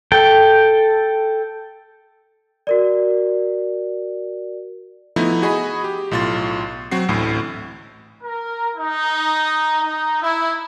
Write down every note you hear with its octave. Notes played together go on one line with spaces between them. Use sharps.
A4 G5
F#4 A#4 D5
F3 A3 B3 D#4 E4
F#4 G#4 D#5 B5
G4
B1 A2 F4 C6 A6
F#3 C4 F#4 C7
A1 D2 A2
A#4
D#4
D#4
E4